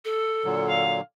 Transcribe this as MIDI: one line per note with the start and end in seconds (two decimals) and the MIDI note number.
0.05 0.83 69
0.44 1.01 46
0.44 1.01 50
0.44 1.01 54
0.69 0.97 77